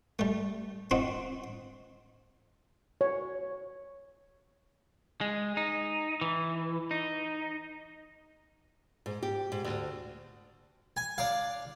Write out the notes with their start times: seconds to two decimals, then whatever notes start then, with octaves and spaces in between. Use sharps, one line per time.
0.19 G3 A3
0.91 C4 D#4 F4 F#4
3.01 C#5
5.21 G#3
5.57 D#4
6.21 E3
6.91 D#4
9.06 G#2
9.23 G4
9.52 G#2
9.64 D2
10.97 G#5
11.18 D4 F5